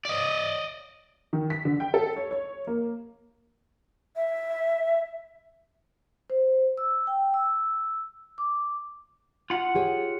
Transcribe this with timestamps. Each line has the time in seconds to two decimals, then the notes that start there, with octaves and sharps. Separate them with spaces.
0.05 D5 D#5
1.33 D#3
1.50 B6
1.65 D3
1.80 G5
1.94 A4
2.16 C#5
2.31 C#5
2.67 A#3
4.16 E5
6.30 C5
6.78 E6
7.07 G5
7.34 E6
8.38 D6
9.50 F4 F#5
9.75 G4 G#4 C#5